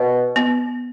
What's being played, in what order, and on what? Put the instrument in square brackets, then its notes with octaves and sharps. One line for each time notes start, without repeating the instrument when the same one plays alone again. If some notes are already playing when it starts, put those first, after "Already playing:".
Already playing: [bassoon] B2
[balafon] B3